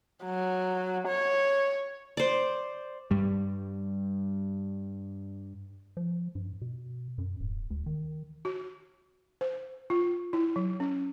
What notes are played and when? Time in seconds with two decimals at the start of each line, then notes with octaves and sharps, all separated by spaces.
0.24 F#3
1.08 C#5
2.17 C5 D5
3.11 G2 G3
5.97 F3
6.35 G2
6.61 B2
7.18 F#2
7.40 D1
7.70 D2
7.86 D#3
8.45 F#4
9.41 C5
9.90 F4
10.33 E4
10.56 F#3
10.80 C#4